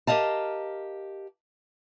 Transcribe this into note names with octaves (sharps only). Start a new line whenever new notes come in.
G4 A#4 C5 D#5 F5 A5